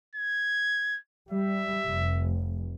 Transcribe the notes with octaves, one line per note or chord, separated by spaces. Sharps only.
G#6
G3 E5
F1